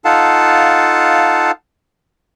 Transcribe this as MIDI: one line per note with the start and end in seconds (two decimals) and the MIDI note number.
0.05 1.51 63
0.05 1.51 65
0.05 1.51 69
0.05 1.51 77
0.05 1.51 78
0.05 1.51 81